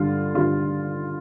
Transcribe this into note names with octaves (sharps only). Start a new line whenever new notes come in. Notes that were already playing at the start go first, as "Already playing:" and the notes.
Already playing: G2 D3 G3 F4
G2 D3 G3 F4